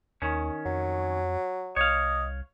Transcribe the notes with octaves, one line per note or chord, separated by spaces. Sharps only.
D#2 D#3 C#4
F2 F#3
C2 C#5 D#5 F5